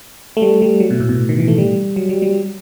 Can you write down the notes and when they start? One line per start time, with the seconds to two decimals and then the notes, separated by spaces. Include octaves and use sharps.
0.37 A3
0.42 G3
0.62 G3
0.80 F#3
0.90 B2
1.00 A2
1.09 B2
1.29 D#3
1.39 E3
1.48 A3
1.58 G3
1.96 F#3
2.09 G3
2.22 G3